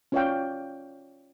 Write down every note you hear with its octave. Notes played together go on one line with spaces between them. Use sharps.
C#4 F4 C#5 D5 F5 G5